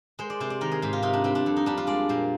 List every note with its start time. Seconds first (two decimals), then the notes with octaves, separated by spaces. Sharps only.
0.19 G#3 C5
0.30 D5
0.40 C3 C5
0.50 D5
0.61 D#3 A#4
0.71 G#4
0.82 G#2 G4
0.93 F4
1.03 C3 D#4
1.13 D4
1.24 G3 C4
1.35 D4
1.46 F2
1.56 D#4
1.66 G3 D4
1.77 F4
1.87 G#3 D5
2.09 A#2 C5